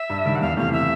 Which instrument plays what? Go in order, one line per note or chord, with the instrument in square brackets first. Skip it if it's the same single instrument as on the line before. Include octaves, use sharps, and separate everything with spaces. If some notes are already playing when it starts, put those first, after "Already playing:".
Already playing: [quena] E5
[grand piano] G2
D#3 G3
[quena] F#5
[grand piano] E2 [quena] F5
[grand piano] C3 E3 A3 [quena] F5
[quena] E5